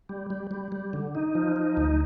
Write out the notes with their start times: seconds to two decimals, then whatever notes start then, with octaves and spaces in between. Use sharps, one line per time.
0.09 G3
0.30 G3
0.51 G3
0.72 G3
0.93 D3
1.15 D#4
1.35 F3
1.56 D#4
1.77 D2